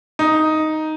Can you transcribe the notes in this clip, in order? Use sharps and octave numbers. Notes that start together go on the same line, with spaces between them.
D#4